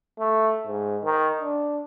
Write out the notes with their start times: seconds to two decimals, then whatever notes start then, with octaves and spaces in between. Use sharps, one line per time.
0.19 A3
0.67 G#2
1.05 D#3
1.42 D4